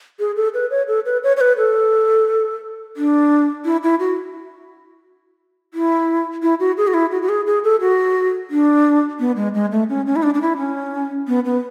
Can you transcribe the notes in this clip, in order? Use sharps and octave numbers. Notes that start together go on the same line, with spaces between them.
G#4
A4
B4
C#5
A4
B4
C#5
C#5
B4
A4
D4
E4
E4
F#4
E4
E4
F#4
G#4
F#4
E4
F#4
F#4
G#4
G#4
A4
F#4
D4
B3
G#3
G#3
A3
C#4
C#4
E4
D4
D4
E4
C#4
B3
B3